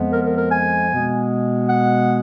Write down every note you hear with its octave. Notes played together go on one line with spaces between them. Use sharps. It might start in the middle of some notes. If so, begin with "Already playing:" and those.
Already playing: F2 F3 G#3 B3
A#4
A#4
A#4
G#5
B2 G#3 B3
F#5